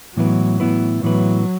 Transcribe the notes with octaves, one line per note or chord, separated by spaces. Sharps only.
A2 E3 F#3 B3 E4 B4
A2 E3 B3 E4 B4
A2 E3 F#3 B3 E4 B4